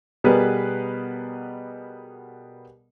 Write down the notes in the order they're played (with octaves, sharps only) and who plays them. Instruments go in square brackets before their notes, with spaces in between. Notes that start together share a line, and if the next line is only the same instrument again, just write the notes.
[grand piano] B2 G3 B3 G#4 A#4 B4